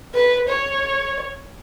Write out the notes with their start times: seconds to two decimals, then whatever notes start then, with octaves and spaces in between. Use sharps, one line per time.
0.14 B4
0.49 C#5